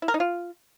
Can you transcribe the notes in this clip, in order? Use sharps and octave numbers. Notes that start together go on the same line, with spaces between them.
E4
A#4
D#4
F4